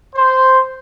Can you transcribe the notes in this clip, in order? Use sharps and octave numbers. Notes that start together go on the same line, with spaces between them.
C5